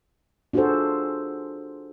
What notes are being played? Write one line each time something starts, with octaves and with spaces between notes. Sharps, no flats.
D4 F4 F#4 G#4 A4 C5